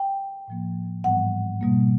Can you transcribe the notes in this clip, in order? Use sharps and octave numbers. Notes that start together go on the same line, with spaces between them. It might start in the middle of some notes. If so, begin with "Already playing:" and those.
Already playing: G5
A2 F3 A#3
G#2 E3 G3 B3 F#5
B2 G3 A#3